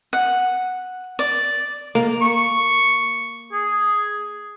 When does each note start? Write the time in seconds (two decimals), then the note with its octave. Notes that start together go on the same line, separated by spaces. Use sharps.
0.13 F#5
1.19 D5
1.95 A#3
2.22 C#6
3.52 G#4